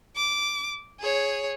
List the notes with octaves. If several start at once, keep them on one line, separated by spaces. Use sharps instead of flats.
D6
G#4 C#5